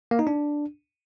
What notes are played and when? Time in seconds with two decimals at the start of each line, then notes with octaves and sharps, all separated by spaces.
0.11 A#3
0.19 D#4
0.27 D4